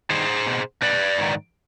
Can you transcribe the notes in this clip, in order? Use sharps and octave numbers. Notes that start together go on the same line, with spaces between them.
G2 D#3 G#4 C5
B2
B2 B4 D5
G#2 D#3